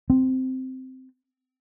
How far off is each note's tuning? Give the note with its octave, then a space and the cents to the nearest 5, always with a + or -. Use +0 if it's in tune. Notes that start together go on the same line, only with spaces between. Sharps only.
C4 -10